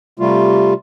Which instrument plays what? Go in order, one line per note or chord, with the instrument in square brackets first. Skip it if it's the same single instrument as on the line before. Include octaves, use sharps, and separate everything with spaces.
[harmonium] C3 G3 A3 F4